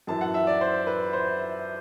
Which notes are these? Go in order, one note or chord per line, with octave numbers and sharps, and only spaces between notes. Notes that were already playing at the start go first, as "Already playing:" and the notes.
F#2 E3 A5
F#5
E5
D5
C5
B4
C5